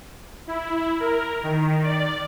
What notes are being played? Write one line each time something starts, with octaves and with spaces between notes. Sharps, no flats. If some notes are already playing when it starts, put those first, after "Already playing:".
E4
A#4
D#3
D5